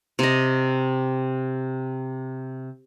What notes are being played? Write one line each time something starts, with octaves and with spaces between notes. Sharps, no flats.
C3 D#5